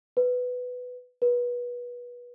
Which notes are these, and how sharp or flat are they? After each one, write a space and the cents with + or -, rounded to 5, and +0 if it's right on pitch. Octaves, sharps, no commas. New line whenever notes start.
B4 +10
B4 -25